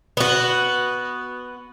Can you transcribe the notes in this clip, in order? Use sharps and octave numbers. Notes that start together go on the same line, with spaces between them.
B3 F#4